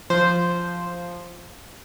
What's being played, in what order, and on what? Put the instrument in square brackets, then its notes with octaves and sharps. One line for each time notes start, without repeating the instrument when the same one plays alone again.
[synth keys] F3 C5